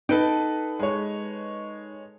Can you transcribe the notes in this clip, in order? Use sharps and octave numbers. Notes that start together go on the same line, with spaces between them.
D#4 A4 B4 G5
G#3 C#5